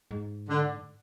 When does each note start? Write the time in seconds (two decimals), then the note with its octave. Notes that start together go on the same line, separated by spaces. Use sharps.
0.11 G#2
0.48 D3